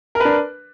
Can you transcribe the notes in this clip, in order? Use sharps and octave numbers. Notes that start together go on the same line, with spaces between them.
D4 A#4 B4